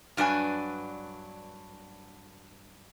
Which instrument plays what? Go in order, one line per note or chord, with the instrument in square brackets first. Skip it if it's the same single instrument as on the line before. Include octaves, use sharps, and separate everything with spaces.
[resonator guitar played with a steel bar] G2 F#3 D4 B4 G#5